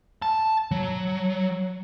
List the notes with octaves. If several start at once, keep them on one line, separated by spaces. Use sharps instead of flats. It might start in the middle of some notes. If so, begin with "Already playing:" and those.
A5
F#3